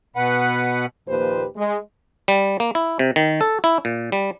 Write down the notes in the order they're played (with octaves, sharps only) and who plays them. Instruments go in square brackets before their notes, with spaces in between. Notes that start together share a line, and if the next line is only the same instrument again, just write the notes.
[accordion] B2 B4 F#5
[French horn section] D#2 A#2 F3 G4 B4 C5
G#3
[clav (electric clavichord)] G3
A#3
E4
C3
D#3
A4
E4
A#2
G3